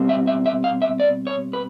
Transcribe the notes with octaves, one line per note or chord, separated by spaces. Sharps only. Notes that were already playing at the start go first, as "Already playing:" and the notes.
Already playing: B2 G3 C4
E5
E5
E5
F5
E5
D5
C#5
B4